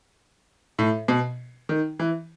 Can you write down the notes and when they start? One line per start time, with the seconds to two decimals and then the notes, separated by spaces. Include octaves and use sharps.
0.79 A2
1.08 B2
1.69 D#3
1.99 E3